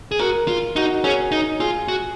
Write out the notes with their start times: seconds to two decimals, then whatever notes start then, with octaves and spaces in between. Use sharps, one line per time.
0.12 G#4
0.20 F#4 A#4
0.48 F4
0.76 D#4 F#4
1.04 C#4 G#4
1.32 D#4
1.60 F4 G#4
1.88 F#4